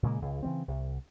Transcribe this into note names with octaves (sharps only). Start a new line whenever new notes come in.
A#2 C#3 G#3 A#3
C#2 C#3
C#3 E3 G3 C4
C2